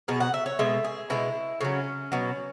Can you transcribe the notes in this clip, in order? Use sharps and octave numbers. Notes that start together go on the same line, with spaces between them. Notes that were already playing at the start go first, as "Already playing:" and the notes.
B2 F#3 G#4
F#5
E5
C#5
B2 G#3 E5
G#4
B2 G#3 E4
C#3 F#3 C#4
B2 F#3